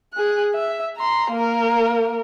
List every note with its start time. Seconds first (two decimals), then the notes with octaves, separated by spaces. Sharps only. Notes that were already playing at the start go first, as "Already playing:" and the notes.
0.14 G#4 F#6
0.54 E5
0.97 A#5 C6
1.32 A#3 A#4